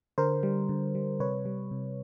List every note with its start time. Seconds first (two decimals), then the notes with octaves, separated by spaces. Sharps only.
0.18 D3 A#4 C5
0.43 G3
0.69 D3
0.95 G3
1.20 C3 B4 C#5
1.45 G3
1.71 C3